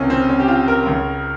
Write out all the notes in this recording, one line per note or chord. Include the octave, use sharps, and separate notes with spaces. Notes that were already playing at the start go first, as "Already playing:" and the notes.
Already playing: C#2 C3 D#3 C#4
C4
C#4
G4
F4
A#4
C#2 C#3